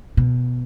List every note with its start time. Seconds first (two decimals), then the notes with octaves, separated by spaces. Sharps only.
0.17 B2